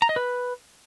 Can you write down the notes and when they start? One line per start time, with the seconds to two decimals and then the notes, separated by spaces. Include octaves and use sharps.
0.02 A#5
0.09 D#5
0.16 B4